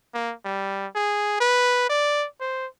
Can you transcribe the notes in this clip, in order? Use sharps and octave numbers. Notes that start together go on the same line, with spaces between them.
A#3
G3
G#4
B4
D5
C5